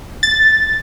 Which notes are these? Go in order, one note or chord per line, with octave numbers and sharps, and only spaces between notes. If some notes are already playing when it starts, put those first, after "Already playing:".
A6